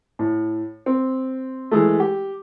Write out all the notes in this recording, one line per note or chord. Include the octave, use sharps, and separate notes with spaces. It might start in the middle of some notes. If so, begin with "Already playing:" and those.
A2
C4
E3 G#3 A3
G4